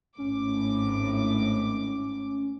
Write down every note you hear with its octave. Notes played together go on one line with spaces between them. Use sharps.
G#1 A2 C#4 D6